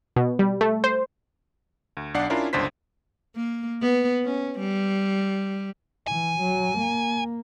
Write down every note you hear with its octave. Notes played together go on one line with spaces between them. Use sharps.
B2
G3
A3
C5
D2
B1 D4 D5 F#5 C7
C#4 D4 E4 F4 A#4
G1 C#2 D4 C5 B6
A#3
B3
C#4
G3
E3 G#5
F#3
A#3